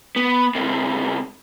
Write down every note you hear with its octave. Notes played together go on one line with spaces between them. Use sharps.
B3
C#2 C3